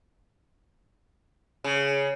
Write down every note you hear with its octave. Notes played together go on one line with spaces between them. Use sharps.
C#3